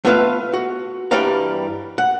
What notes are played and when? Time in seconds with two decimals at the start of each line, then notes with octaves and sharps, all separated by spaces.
0.05 A3 B3 F4 B4 E5 F5
0.54 F#4
1.11 G2 E3 G3 D5 F5 A#5
1.98 F#5